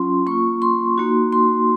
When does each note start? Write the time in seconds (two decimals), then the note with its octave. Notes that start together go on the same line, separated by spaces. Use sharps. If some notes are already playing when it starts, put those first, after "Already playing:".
Already playing: F#3 C#4 F4 C6
0.27 A#3 F4 C#6
0.62 C6
0.98 A#3 D#4 F#4
1.32 C6